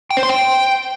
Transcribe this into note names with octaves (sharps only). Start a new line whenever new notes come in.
G5
C5
C6
G5